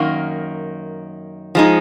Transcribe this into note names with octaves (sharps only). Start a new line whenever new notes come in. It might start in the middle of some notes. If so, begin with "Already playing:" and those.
Already playing: F#2 D#3 A#3
F3 G#3 D#4